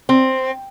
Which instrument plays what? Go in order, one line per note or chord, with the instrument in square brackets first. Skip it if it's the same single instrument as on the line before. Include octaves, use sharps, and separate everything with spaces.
[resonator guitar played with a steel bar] C4